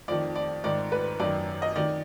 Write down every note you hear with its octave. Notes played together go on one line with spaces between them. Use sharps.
F2 D#3 D5
D5
G#2 D#3 D5
B4
F#2 D#3 D5
D#5
D#3 D5